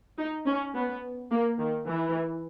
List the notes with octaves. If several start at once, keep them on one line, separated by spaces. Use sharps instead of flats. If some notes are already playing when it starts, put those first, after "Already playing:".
D#4
C#4
B3
A#3
D#3
E3